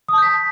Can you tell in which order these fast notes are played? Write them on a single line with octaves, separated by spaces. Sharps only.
D#6 A5 G6 B6